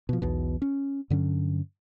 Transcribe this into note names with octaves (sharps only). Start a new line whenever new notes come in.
B2 F3
B1 E2 B2
C#4
G2 D3 F#3 C#4